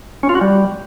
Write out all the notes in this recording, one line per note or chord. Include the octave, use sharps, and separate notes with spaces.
C#4
F4
F#4
G3